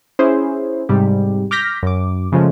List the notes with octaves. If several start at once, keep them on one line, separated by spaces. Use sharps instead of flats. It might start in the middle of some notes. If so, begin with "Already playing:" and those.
C#4 E4 G#4 C5
G#2 C3 G3 G4
D6 F6 G6 A#6 B6
F#2 D6
C#3 F3 G#3 A3